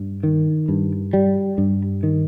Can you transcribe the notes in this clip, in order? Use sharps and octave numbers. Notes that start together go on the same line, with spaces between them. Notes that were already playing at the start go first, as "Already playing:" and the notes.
Already playing: G2
D#3
G2
G3
G2
D#3